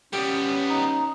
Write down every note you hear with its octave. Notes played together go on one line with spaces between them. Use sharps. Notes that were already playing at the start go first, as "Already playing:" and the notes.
G3 B3 C#4 G4
D#4